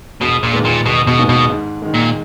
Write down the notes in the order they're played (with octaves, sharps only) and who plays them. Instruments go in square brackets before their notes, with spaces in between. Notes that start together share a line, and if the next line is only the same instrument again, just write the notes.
[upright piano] E1 [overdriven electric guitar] B2
[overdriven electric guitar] A#2
[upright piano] D#2 D#3 G#3 B3
[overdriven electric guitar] A#2
[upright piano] E1 [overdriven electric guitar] B2
[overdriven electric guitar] B2
[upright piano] D#2 D#3 G#3 B3
[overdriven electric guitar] B2
[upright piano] G#2
D#3 G#3
[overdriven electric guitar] A#2